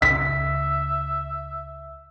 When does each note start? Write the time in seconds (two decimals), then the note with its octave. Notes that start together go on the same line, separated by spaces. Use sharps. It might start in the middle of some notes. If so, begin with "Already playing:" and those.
0.02 C#2 E5 B6